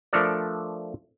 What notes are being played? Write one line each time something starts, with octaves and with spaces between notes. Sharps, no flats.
F3 A3 D4 A4 A#4 D5